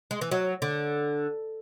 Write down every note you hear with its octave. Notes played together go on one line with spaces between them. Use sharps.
G#3
E3
F#3
D3